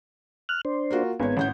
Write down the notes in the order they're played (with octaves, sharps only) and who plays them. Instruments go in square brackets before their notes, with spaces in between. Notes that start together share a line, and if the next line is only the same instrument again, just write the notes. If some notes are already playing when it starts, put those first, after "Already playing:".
[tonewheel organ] F6 F#6
D4 C5
[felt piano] A#3 F4 F#4
[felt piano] G#1 C#5 [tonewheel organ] B3 G#5
[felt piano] A1 F#5 G6 [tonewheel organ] C#4